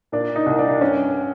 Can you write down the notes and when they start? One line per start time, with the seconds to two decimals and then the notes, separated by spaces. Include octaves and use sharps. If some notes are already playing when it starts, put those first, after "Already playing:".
0.12 A#2 D4
0.36 D#4
0.46 C2
0.59 D4
0.81 G2 C#4